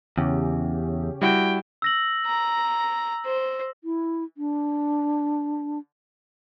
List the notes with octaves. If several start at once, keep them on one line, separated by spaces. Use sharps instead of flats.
E2 C#3 C#4 G4
G3 E4 F#4 G5
E6 A#6 F#7
A#5
C5
E4
D4